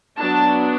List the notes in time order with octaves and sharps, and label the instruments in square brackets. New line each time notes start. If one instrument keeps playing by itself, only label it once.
[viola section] F#3 B3 D4 A5